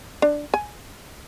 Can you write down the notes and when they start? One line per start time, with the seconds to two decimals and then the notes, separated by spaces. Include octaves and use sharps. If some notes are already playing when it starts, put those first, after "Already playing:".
0.22 D4
0.54 G#5